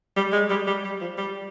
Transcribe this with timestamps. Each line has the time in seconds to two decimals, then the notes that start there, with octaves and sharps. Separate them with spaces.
0.17 G3
0.33 G#3
0.50 G3
0.67 G3
0.84 G3
1.01 F3
1.18 G3